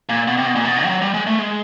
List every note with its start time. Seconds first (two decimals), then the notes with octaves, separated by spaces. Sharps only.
0.09 A#2
0.28 B2
0.37 C3
0.46 B2
0.56 A#2
0.65 B2
0.77 C3
0.85 G3
0.89 F#3
1.02 G3
1.14 G#3
1.27 A3
1.39 G#3